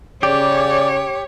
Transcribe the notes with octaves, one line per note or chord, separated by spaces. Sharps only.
C#3 G4 C#5 D5